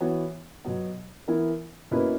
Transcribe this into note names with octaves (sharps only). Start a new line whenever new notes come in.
E3 B3 F#4 C#5
B2 F#3 B3
E3 B3 E4 A#4
B2 A#3 C#4 E4 B4